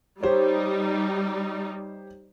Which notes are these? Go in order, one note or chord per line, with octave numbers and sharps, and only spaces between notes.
G3 D#4 G4 C5 C#5